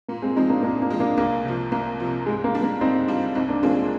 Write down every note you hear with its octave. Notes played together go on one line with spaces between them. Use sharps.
A#2 A#3
G#3 C4
F3 G#3 C4 D#4
A#3 D4
A#2 A#3 D4
A#3
F3 G#3
A#3 D4
C2 A#3
C3 F3
C2 A#3
C3 F3
G#2 G#3
A#3
G3 D4 F4
A#3
G#2 C4 D#4
G3 D4 F4
C2 C4 D#4
A#3 D4
A#2 F3 G#3 A#3 C4 D4
G#3